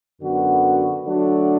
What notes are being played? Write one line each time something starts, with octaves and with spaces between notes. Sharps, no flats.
F#2 D3 B3 F#4
D3 F#3 A3 D4 F#4